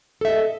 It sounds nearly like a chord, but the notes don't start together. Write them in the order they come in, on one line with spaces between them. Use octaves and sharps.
A4 E5 D#5